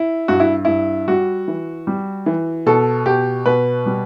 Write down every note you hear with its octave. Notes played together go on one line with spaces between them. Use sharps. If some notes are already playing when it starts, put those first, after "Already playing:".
Already playing: E4
G2 F#4
E4
G2 E4
G3 F#4
E3
G3
E3
B2 A4
B2 G4
B2 B4
G3